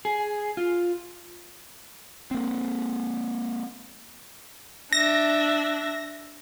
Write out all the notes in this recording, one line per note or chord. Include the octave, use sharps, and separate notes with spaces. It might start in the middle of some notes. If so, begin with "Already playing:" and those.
G#4
F4
A#3 C4
D4 E5 A#6